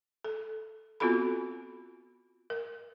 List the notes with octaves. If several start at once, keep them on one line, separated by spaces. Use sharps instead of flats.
A4
B3 C4 F4 F#4 A4 B5
A#4